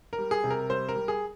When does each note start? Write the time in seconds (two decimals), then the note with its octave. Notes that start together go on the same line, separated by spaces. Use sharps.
0.13 A#4
0.18 G3
0.31 G#4
0.44 C3
0.50 A#4
0.69 G3 C5
0.89 A#4
0.96 G3
1.08 G#4